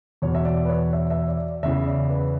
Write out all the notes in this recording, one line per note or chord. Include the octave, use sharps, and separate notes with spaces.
E2 B2 C#5
E5
D5
B4
C#5
E5
E5
D5
E2 C#3 E3 E5
D5
B4